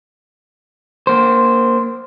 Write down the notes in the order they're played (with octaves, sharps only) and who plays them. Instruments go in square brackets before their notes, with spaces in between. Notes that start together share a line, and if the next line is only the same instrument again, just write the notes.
[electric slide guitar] A#3 C5